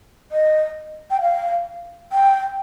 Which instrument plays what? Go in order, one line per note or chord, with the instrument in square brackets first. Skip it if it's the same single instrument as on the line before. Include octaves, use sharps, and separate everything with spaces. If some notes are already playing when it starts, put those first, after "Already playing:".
[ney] D#5
G5
F5
G5